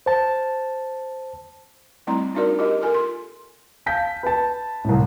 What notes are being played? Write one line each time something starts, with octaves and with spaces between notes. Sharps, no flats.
C5 A5
G3 A3 C4 E4 A#5 C6
D4 D#4 F#4 A#4 D5
F4 G4 A#4 D#5
F4 A4 A#4 G#5
C6
F5 A5 G6 B6
B4 A5
C2 A2